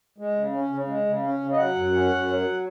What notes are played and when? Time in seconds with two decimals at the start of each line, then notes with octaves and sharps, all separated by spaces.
0.18 G#3
0.36 C#3
0.53 C#4
0.70 C#3
0.88 G#3
1.06 C#3
1.23 C#4
1.41 C#3
1.53 D#5
1.58 F#3 F#5
1.75 F#2
1.94 C#4
2.10 F#2
2.28 F#3